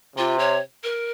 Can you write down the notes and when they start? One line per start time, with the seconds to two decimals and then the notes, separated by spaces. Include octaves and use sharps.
0.17 C3 F4
0.39 C#5
0.83 A#4